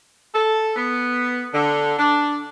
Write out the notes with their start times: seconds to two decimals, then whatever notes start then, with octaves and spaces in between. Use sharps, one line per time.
0.34 A4
0.76 B3
1.54 D3
1.98 D4